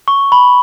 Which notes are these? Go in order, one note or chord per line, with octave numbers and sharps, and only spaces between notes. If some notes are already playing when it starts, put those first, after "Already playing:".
C#6
B5